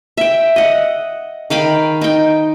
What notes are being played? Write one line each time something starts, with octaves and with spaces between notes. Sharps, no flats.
E5 G5
D#5 F#5
D#3 F5 G5 B5
D#4 G5